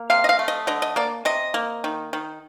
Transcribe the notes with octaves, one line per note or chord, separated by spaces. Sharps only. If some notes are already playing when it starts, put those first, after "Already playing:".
Already playing: A#3
C3 F5
D#5
F5
A3
D#5
D3 D#5
D#5
A#3 D5
C3 D#5
A#3
D#3
D#3